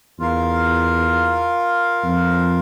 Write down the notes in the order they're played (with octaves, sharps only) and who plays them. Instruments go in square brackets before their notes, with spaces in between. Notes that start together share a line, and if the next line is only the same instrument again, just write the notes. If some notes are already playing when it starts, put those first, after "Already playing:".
[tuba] E2 [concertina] F4 A#4 F5
[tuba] F2